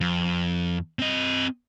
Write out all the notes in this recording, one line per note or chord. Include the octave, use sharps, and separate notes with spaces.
F2
C4 D#5